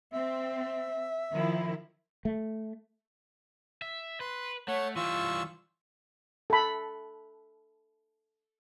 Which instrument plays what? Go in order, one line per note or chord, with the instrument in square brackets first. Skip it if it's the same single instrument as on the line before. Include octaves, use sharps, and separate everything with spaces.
[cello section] C4 [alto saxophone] E5
[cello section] D#3 F3 E4
[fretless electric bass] A3
[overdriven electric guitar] E5
[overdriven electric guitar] B4 [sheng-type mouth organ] C6
[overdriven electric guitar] A3 [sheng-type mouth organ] C#5 F#5
[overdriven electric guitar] E3 G3 [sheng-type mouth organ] F4 C#6 E6
[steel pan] A4 B5